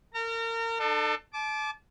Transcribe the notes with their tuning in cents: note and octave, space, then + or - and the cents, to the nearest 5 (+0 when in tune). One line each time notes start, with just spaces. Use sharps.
A#4 -30 A#5 -35
D4 +45 A4 +15
A5 -35 D6 +0